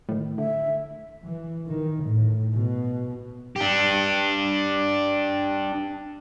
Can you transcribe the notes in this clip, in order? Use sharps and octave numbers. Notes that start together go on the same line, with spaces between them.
A2 D#3
D3 E5
E3
D#3
A2
B2
D4 G4